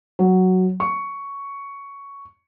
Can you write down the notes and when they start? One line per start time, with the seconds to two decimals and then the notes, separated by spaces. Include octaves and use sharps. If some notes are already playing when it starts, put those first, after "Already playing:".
0.19 F#3
0.80 C#6